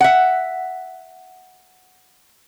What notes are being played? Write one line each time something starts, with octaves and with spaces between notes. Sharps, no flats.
E5 F#5